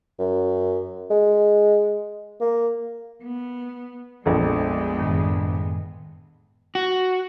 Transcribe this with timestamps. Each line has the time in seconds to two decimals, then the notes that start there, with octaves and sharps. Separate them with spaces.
0.19 F#2
1.11 G#3
2.40 A#3
3.23 B3
4.26 A#1 F2 G#3 B3
4.98 F#2 A2 D#3
6.75 F#4